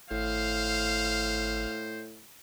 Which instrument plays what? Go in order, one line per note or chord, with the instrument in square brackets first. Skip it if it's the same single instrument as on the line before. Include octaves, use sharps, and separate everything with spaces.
[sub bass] G#1 [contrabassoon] A2 [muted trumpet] C5 [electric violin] F5 F6